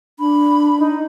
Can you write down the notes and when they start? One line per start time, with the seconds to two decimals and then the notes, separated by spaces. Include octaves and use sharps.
0.19 D4 B5
0.80 D#4